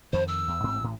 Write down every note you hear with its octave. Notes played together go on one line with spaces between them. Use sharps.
F2 D#3 C5
E6
E2
A1 G#2 C4
A1 A2